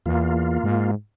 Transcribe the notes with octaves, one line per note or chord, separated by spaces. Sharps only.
E2 A#3 F4
G#2